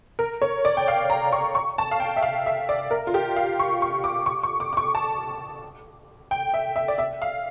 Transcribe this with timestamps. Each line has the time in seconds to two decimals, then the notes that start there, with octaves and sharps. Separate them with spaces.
0.19 A#4
0.42 C#5
0.65 D5
0.77 G5
0.88 F5
1.10 A#5
1.32 C#6
1.55 C#6
1.78 A5
1.91 F5
2.00 G5
2.16 E5
2.22 F5
2.46 E5
2.69 D5
2.91 A#4
3.07 F4
3.14 G4
3.36 F5
3.59 C#6
3.82 C#6
4.04 D6
4.26 C#6
4.43 C#6
4.60 D6
4.73 D6
4.77 C#6
4.95 A5
6.31 G5
6.54 E5
6.76 E5
6.88 D5
6.98 E5
7.22 F5